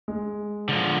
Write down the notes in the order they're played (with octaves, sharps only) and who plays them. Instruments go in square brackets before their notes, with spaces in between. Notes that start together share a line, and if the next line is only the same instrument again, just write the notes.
[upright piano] G#3
[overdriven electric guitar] D3 F3